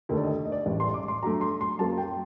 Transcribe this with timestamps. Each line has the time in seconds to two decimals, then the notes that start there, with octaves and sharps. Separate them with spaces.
0.09 D#2 D3 A3 A#4
0.17 D5
0.24 D#5
0.45 D#5
0.52 D5
0.66 A1 A2 G3
0.80 C6
0.94 D6
1.08 C6
1.22 G2 F#3 A3 A#5
1.41 C6
1.61 C6
1.79 F#2 F#3 A#3 A5
1.98 G5